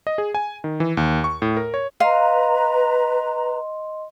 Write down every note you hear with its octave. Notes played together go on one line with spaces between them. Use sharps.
D#5
G#4
G#5
D#3
E3
D#2
C#6
A2
A#4
C#5
B4 D#5 F5 A#5 C6